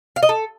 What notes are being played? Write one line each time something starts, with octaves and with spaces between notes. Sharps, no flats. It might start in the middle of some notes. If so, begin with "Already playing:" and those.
F5
D#5
A4